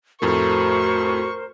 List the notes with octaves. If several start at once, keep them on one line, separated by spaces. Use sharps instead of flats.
F2 A2 A3 F#4 A#4 C5 C#6